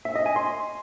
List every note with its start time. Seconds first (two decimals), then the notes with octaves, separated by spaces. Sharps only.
0.05 E5
0.16 D#5
0.26 G#5
0.36 C6